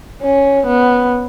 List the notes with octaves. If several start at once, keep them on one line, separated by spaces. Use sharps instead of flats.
C#4
B3